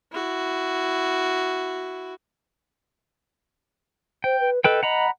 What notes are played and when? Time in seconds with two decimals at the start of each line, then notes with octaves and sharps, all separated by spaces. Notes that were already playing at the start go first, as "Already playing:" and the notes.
0.12 E4 F#4
4.24 C5 G5
4.40 B4
4.64 A4 B4 D#5 G5
4.83 D#5 F#5 A#5 B5